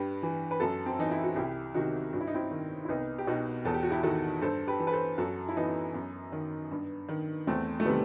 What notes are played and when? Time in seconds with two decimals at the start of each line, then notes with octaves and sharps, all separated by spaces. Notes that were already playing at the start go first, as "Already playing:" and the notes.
Already playing: G2 G4 B4
0.23 E3
0.51 B4
0.60 F#2 F#4 A4
0.86 C4
0.99 E3 D#4
1.11 E4
1.23 F#4
1.36 C2 E4 G4
1.74 C3 D#3 D#4 F#4
2.13 G2 F#4
2.20 E4
2.27 D#4
2.34 C4 E4
2.51 D#3
2.85 E4
2.89 C2 B3 D#4
3.18 G4
3.27 B2 D#4 F#4
3.65 E2 A4
3.74 G4
3.83 F#4
3.90 E4 G4
4.03 D#3 F#4 A4
4.41 G2 A4 C5
4.67 G4 B4
4.80 E3
4.87 B4
4.92 A4 C5
5.18 F#2 F#4 A4
5.48 E4
5.56 E3 B3 D#4
5.94 F#2
6.32 D#3
6.71 G2
7.08 D#3
7.47 E2 A3 C4
7.80 A3
7.85 C3 D#3 G3 B3